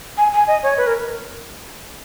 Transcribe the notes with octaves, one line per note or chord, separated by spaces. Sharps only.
G#5
G#5
D#5
C#5
B4
A#4